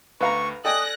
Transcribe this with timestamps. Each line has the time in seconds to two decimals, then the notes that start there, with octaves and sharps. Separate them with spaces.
0.21 D2 B4 F5 A#5 C#6
0.65 A4 D5 D#5 G5 G#5 D#6 F#6 A#6